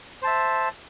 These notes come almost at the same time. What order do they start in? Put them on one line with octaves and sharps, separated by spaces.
C5 A5 E5